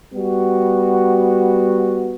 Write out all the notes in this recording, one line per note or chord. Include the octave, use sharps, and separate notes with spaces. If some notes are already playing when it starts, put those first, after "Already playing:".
G3 B3 F#4